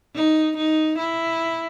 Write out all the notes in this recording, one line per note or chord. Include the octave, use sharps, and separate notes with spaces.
D#4
D#4
E4